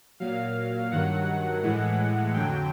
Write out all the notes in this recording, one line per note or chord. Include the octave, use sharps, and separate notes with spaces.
A#2 F#3 F5
G2 D#3 F#3 F#5
A2 E3 G#3
F2 D3 F#3 G5